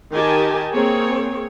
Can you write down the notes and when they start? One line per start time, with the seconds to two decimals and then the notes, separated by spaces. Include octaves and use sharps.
0.13 D#3 G4 A#4 D#5 G#5 A5
0.74 A#3 C4 G#4 C#5